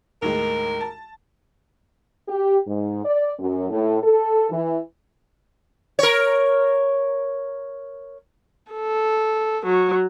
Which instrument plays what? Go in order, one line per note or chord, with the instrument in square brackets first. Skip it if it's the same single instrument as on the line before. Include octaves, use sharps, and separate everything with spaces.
[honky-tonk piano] D#2 A2 G#3 [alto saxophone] A#4
[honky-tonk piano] A5
[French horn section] G4
G#2
D5
F#2
A2
A4
E3
[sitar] A#4 C#5
[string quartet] A4
F#3